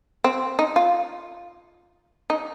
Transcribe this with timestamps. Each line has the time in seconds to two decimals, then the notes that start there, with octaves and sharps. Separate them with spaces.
0.24 C4
0.59 D#4
0.76 F4
2.30 D#4